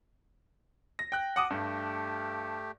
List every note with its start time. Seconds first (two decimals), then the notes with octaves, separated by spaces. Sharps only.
0.99 A#6
1.12 G5 F#6
1.36 F#5 A5 D6 D#6
1.50 G2 A3 G4